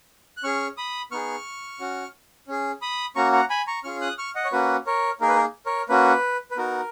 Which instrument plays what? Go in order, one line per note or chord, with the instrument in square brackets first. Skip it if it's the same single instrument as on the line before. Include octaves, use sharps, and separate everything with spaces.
[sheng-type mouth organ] F#6
C#4 G#4 C#6 F6
B5 D#6
B3 D#4 G#4 C#6 F6
C#4 F#4
C#4 G#4
B5 D#6
A#3 C#4 F#4 A#5 C#6
F#5 A#5
G#5 B5
A#5 C#6
C#4 F4 G#4 C#6 F6
D#6 F#6
C#6 F6
D#5 F#5
C#5
A#3 C#4 F#4 B4
A#4 C#5
A#3 D#4 G#4 A#4
B4
A#4
A#4 C#5
A#3 C#4 F#4 B4
B4
B3 D#4 F#4 A#4